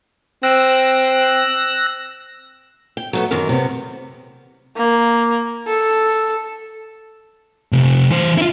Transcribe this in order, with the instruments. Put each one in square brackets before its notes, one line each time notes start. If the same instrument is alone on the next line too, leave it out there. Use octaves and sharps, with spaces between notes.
[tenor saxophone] C4 [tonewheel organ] E6 F#6 A#6
[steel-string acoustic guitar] G5
F#3 A3 B3
F#2 D#3 E3 A#4
C3 B3
[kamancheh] A#3
A4
[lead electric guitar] C3 A3
E3 C5
E4 F4